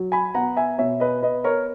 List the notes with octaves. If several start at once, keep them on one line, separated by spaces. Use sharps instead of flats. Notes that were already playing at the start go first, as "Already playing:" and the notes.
Already playing: F#3
G#5 B5
B3 F#5 A#5
E5 G#5
B2 C#5 E5
B4 D#5
B3 B4 D#5
A#4 C#5